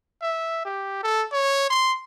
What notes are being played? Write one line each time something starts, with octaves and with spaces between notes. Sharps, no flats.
E5
G4
A4
C#5
C6